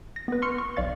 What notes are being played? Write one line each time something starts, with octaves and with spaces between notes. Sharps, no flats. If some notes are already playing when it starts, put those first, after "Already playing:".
A#6
B3 B4
C6 C#6 F6 C#7
C#6
B1 D5 F5 A6